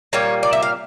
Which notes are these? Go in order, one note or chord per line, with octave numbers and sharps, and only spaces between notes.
A#2 G3 A#3 C#5
D5
E5
F5